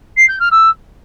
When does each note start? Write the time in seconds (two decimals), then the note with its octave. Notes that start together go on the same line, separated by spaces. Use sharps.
0.17 C7
0.28 G6
0.40 F6
0.51 E6